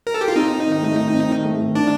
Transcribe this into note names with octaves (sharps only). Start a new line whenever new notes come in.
A#4
A4
G4
F4
C4 D#4
C4
D#3
A3
D#3
C4
D#3
A3
D#3
D#3 D4